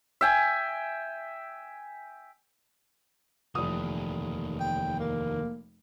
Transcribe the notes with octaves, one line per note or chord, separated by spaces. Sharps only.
E5 G5 G#5
F1 D#2 E3 D#6
G5
A#3